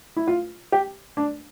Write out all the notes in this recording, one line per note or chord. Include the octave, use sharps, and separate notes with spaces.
E4
F4
G4
D4